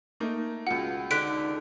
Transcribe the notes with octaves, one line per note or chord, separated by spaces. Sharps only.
A3 A#3 D#4
C#2 B2 F4 F#5
D3 D#4 F#6 B6 D7